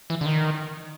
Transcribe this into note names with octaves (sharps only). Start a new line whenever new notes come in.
E3
D3
D#3